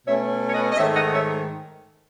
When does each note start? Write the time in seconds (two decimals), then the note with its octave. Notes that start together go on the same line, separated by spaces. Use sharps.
0.06 B2 A3 C#4 C#5 E5
0.48 C#5
0.53 B4 D#5
0.72 D#5
0.77 G#2 D#3 A3 C#5 E5
0.95 D#5 F#5
1.12 C#5 E5